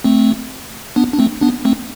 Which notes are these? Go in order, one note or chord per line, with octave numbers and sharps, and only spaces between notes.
A3 C4
B3 D4
D4
A3 C4
B3 D4
A3 C4